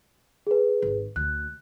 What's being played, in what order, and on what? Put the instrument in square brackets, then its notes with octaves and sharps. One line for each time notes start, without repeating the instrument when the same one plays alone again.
[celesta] G#4 B4
[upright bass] G#1
[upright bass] D2 [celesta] F#6